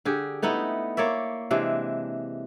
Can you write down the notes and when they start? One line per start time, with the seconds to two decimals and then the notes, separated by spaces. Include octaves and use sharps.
0.05 D3 G4 G#4
0.42 A3 B3 D#4 E4
0.97 A#3 C#5 D5 E5
1.51 C3 E3 G#3 D4